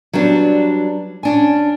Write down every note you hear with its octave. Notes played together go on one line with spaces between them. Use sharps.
F#3 G3 B3 D4
C#4 D4 G#5